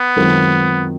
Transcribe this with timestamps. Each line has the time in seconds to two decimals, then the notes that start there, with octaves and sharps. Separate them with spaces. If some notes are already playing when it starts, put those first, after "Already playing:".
Already playing: B3
0.16 F#2 D#3 G#3 C4 F4